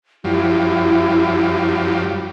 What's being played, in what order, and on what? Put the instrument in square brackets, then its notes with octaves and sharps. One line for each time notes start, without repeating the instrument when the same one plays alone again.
[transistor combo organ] F#2 F3 G3 [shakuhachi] E4